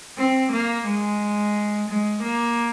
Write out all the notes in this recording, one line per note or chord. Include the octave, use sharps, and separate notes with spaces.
C4
A#3
G#3
G#3
A#3